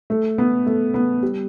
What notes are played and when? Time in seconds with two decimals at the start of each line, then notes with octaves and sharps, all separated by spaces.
0.10 A3
0.38 B3
0.66 A3
0.94 B3
1.23 G3